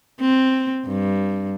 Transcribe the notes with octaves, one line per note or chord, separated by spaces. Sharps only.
C4
G2